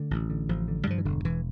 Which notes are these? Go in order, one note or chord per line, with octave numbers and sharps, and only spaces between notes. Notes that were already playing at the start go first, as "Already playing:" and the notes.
Already playing: D3 A3
A1
D3
A1 F3
D3
G3
G2 F3
E3
E1 D3
E1 E3